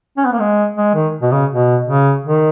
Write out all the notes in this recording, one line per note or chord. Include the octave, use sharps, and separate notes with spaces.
C#4
B3
A#3
G#3
G#3
D#3
B2
C#3
B2
C#3
D#3